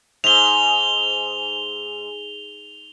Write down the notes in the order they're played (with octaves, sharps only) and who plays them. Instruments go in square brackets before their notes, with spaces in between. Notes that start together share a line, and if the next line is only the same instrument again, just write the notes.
[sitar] G#2 [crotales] F7 G7